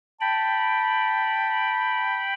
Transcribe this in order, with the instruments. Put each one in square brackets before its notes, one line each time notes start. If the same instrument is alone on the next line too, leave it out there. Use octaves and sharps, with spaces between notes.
[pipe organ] G5 B5 [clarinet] A5